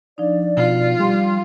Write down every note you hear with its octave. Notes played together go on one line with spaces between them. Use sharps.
F3 D4 D#4 D5
B2 F4
G3 C6